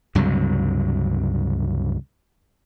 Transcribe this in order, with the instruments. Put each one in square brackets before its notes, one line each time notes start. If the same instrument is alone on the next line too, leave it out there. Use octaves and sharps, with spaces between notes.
[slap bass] C#2 G2 C3 F#3